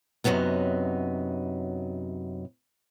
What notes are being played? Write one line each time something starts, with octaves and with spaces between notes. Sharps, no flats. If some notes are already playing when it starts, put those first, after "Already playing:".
F#2 C3 F#3 B3 D#4